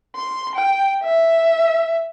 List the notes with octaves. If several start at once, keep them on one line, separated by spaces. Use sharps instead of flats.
C6
G5
E5